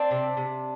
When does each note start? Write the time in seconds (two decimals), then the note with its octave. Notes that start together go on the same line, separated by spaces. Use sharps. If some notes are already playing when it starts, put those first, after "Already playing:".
Already playing: C4 D4
0.11 C3
0.37 C3